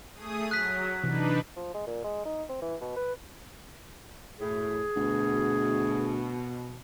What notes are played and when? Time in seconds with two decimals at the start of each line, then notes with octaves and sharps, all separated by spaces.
0.13 A3 G#4 D#6
0.51 F#3 F#6 B6
1.03 C3 E3 D4 D#4 B4
1.56 F3
1.74 G#3
1.87 A#2
2.04 G#3
2.25 D#4
2.49 C4
2.62 E3
2.81 B2
2.96 B4
4.40 F#2 A2 G#4
4.96 D2 B2